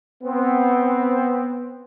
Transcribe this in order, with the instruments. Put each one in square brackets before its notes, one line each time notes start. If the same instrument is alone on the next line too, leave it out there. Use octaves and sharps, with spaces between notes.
[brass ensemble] B3 C4